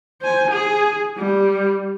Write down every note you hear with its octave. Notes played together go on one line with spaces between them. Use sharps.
C5 G#5
G#4 G#5
G3